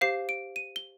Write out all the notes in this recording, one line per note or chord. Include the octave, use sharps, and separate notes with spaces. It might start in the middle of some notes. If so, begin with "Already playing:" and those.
G4 C5 F5 C7
D7
D#7
G7